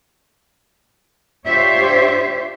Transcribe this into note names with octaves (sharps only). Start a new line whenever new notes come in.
D4 F4 G4 C5 C#5 E5